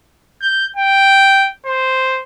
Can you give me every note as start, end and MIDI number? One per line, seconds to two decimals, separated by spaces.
0.42 0.66 91
0.76 1.49 79
1.66 2.22 72